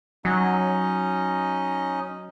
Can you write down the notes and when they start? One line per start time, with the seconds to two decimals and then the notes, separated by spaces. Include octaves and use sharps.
0.25 F#3 C#4 D#4 D#5